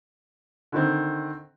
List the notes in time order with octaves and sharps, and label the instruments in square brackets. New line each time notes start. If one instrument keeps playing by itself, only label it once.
[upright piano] D3 D#3 C4